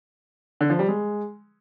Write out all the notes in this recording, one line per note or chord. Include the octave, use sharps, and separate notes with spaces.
D3
F3
G3
G#3